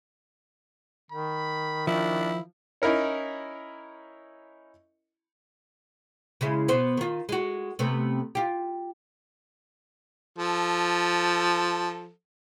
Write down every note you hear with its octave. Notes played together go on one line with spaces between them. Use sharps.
D#3 B5
F3 D4 E4
C#4 D#4 E4 A#4 C#5
C#3 G#3 E4
B2 B3 C5
D#3 F4
G#3 F#4
C3 A3 B3
F4 G4
F3 A4